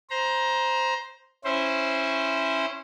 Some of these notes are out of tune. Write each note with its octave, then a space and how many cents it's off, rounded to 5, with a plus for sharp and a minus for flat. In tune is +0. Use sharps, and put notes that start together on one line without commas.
C5 +0 A#5 +20
C#4 -15 E4 +0 C5 +0